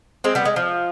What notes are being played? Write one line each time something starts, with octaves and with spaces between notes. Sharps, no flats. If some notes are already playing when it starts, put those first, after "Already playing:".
G#3 C4
G3 B3
G#3
F3